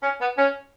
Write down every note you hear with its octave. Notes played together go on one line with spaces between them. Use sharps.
C#4
B3
C#4